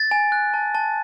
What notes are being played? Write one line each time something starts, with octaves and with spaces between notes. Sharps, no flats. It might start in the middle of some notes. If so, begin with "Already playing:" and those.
Already playing: A6
G#5
F#6
A5
A5